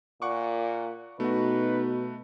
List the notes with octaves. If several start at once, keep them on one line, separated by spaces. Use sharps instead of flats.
A#2 F#5 C#6 D6
B2 A3 D#4 F#4 B4